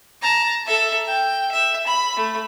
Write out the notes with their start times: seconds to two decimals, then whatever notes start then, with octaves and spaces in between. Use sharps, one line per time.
0.22 A5 A#5
0.66 A4 E5
1.07 G5
1.52 E5
1.87 B5
2.16 A3